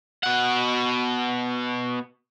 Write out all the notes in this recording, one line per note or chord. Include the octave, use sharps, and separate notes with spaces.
B2 F#5